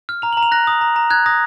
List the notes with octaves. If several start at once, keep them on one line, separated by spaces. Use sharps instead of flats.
F6
A#5 F7
F#7
A#5
F7
F#6 A#6
D#6
A#5
A#5
F#6 G#6
D#6 A#6